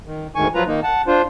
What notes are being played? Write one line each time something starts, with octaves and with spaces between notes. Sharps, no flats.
D#3
D2 G#2 D#3 G#5 C#6
F3 F#3 F4 B4 A#5
D#3 A#3 D#4
F#5 A5
D4 F4 C5